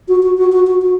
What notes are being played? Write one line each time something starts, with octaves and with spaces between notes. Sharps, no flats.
F#4
F#4
F#4
F#4
F#4
F#4